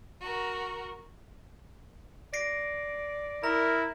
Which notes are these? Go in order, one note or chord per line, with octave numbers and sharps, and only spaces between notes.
F#4 A#4
D5 A#6 C7 D7
E4 A#4 A#5